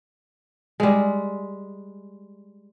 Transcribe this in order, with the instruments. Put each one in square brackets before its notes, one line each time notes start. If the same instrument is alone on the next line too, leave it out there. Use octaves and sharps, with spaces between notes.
[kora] G3 G#3